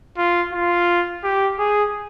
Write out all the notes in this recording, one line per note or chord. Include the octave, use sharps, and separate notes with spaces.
F4
F4
G4
G#4